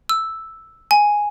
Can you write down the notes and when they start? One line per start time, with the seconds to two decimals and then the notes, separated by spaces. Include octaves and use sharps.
0.09 E6
0.91 G#5